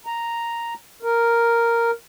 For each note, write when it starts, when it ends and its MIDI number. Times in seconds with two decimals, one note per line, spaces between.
0.06 0.74 82
1.03 1.91 70